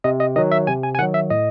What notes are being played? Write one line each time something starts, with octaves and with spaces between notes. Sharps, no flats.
C3 D#5
D#5
D#3 F#3 D#5
E5
C3 G#5
G#5
G#5
D#3 F#3 F#5
E5
A2 D#5